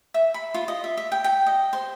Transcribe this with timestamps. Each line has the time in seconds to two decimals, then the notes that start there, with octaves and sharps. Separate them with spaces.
0.14 E5
0.34 B5
0.54 F4
0.68 D#5
0.84 E5
0.97 E5
1.12 G5
1.24 G5
1.47 D#5
1.73 C5